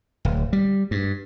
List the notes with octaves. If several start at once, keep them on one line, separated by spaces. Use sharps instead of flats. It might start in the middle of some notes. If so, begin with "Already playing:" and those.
D1
G3
G2